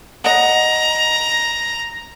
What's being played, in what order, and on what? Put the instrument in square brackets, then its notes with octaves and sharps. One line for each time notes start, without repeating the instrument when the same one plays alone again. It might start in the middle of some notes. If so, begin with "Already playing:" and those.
[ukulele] D#5 F#5 [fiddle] A#5